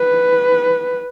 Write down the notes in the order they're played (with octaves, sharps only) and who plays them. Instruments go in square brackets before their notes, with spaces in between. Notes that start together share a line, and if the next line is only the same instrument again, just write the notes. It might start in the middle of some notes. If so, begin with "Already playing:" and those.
Already playing: [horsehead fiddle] B4